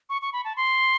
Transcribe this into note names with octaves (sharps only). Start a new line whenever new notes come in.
C#6
C#6
B5
A5
C6